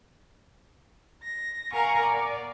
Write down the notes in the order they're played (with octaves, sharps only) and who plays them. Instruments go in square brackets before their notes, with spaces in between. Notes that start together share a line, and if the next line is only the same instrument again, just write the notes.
[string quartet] A#6
A#4 F5 F#5 G#5 A#5 C#6
D5